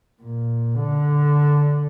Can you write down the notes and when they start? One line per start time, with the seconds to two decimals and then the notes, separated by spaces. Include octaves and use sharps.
0.22 A#2
0.76 D3